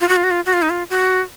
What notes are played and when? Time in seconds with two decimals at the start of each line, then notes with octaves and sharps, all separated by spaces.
0.01 F4
0.09 F#4
0.16 F4
0.24 F#4
0.31 F4
0.46 F#4
0.53 F4
0.62 D#4
0.70 F4
0.90 F#4